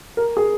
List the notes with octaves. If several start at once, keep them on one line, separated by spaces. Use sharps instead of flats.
A#4
G#4